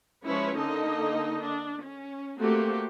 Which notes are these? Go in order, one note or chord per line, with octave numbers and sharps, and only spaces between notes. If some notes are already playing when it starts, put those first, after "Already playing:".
F3 G#3 C#4 E4 B4 C#5
D3 A#3 D#4 A4 D#5
D4
C#4
A3 A#3 C4 F#4 G4